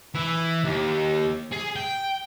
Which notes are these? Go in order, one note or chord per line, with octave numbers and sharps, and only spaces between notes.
E3
D#2
G#4
G5